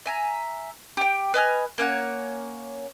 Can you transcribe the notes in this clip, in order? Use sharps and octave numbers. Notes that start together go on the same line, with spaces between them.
E5 G#5 A#5
G4 G5
B4 D#5 G#5 F6
A#3 C#4 C#5 F#5